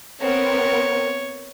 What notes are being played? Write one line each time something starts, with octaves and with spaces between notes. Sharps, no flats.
B3 C4 A#4 C#5